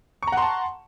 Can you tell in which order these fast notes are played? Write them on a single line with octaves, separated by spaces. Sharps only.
C#6 A#5 F#5 C6 A5